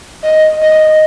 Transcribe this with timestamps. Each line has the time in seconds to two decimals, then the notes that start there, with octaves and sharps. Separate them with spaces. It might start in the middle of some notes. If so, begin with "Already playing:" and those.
0.23 D#5
0.62 D#5